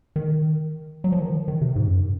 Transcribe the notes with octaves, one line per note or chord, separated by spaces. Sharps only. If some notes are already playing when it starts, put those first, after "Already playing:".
D#3
F#3
F3
D#3
F3
D#3
C3
G#2
F#2